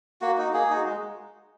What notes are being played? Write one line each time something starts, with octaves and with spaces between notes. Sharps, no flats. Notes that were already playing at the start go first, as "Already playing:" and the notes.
A#3 F#4
D#4 F#4
A#3 G#4
D#4 F#4
G#3